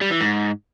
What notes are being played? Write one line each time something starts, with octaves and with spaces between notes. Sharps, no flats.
G3
E3
G#2